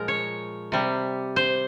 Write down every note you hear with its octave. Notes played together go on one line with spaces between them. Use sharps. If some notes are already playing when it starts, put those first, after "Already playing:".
Already playing: A#2 F3 G#3 A#4
C#5
C3 G3
C5